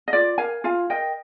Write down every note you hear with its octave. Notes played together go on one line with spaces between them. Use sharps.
D#5
F4 D5
A#4 F5 G#5
F4 F5 G#5
A#4 D#5 G5